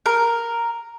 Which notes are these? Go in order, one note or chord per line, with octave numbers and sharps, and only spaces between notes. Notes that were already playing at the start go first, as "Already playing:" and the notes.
A#4